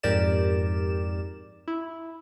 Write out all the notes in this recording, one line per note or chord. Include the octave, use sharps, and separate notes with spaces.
F2 G#2 G4 A#4 D5 E7
E4